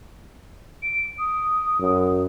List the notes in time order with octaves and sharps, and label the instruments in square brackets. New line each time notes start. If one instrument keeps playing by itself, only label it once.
[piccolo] D7
D#6
[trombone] F#2